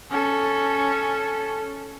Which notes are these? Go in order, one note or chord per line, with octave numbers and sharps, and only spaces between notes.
C#4 A4